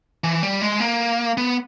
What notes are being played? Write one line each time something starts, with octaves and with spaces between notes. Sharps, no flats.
E3
G3
G#3
A#3
B3